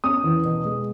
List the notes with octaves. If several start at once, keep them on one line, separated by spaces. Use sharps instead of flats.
C#4 D#6
E2
B2
G#3